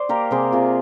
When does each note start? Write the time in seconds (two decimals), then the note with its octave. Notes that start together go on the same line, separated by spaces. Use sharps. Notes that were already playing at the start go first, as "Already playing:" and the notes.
Already playing: C5 D5
0.09 A#3 G4 A#4
0.31 C3 G#4 C5
0.52 C3 F4 G#4